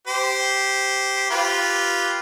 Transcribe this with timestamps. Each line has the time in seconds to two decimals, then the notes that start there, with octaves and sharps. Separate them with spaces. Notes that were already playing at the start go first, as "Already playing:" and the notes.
0.07 G4 C5
1.31 F4 G4 B4